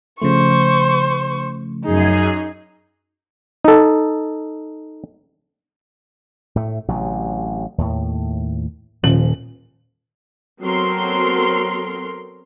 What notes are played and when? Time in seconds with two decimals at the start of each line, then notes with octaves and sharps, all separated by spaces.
0.22 C#3 F3 A3 C5 C#6
1.85 F#2 D#4 G#4
3.65 D#4 A4
6.56 A2 A3
6.88 A1 C3 F#3
7.78 D#2 A2
9.03 D#1 F3 F#7
10.61 F#3 B3 C4 A4 A#4 C6